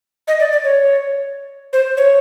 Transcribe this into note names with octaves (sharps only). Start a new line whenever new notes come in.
D#5
D5
D5
C#5
C5
C#5